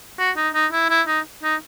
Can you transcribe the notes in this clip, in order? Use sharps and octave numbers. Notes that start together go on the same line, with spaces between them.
F#4
D#4
D#4
E4
E4
D#4
D#4